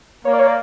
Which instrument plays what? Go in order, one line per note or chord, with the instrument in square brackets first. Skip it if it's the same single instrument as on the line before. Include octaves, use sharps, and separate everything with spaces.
[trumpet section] A#3 [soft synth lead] C#5
[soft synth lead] D5
C#5
D5